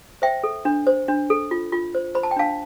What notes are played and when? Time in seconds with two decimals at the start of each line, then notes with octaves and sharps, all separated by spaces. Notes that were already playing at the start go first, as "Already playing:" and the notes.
0.22 C5 E5 G5
0.44 A4
0.65 D4
0.87 C5
1.08 D4
1.30 A4
1.51 F4
1.72 F4
1.95 C5
2.15 C5 B5
2.23 A5
2.31 G5
2.36 D4 F5 A5